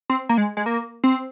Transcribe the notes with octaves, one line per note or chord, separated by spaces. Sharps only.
C4
A#3
G#3
G#3
A#3
C4